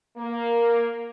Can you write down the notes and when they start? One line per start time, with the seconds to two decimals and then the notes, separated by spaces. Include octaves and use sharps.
0.17 A#3